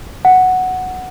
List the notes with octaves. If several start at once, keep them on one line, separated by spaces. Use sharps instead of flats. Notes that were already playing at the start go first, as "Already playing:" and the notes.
F#5